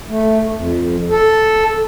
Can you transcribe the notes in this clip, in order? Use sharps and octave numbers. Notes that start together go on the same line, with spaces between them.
A3
F2
A4